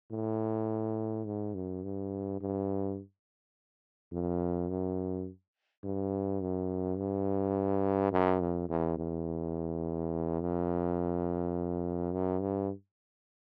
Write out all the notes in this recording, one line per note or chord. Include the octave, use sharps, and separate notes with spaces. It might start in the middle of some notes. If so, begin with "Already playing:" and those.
A2
G#2
F#2
G2
G2
F2
F#2
G2
F#2
G2
F#2
F2
E2
E2
F2
F#2
G2